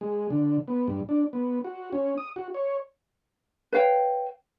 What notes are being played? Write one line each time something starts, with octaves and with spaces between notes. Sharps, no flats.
G#3
D3
B3
G2
D4
B3
F#4
C#4
D#6
F#4
C#5
B4 C#5 F5 G5